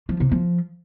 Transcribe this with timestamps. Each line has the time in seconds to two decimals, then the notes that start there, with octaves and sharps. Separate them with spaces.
0.09 F3
0.20 C3
0.31 F3